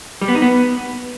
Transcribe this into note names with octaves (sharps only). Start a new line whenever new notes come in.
G3
B3
D#4
B3